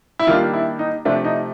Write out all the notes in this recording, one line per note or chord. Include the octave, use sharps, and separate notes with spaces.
E4
D#3 G3 A#3 D4 F4
E4
D#4
C3 F3 A3 D4
D#4